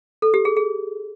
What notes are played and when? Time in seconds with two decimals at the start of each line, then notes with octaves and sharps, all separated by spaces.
0.22 A4
0.34 G4
0.45 G#4
0.57 G#4